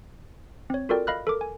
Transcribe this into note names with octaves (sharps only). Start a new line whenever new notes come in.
C4 C#5
F4 F#4 A4 A#4 D5 G5
D#5 F5 B5 F6 F#6
A4 A#4 D6
G#5